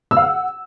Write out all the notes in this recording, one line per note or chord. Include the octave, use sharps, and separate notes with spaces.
E6
F5
F#5